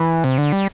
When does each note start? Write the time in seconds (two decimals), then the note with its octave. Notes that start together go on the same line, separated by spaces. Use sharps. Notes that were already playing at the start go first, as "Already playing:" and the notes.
Already playing: E3
0.24 C3
0.38 D3
0.53 G3